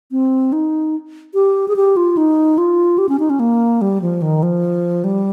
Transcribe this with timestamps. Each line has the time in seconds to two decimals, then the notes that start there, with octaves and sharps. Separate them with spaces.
0.11 C4
0.52 D#4
1.34 G4
1.68 G#4
1.76 G4
1.97 F4
2.17 D#4
2.58 F4
2.98 G4
3.09 C#4
3.19 D#4
3.30 C#4
3.40 A#3
3.81 G3
4.02 F3
4.22 D#3
4.43 F3
5.04 G3